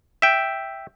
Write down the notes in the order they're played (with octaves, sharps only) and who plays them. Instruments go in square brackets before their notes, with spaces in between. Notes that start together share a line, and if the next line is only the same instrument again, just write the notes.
[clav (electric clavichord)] E5 G5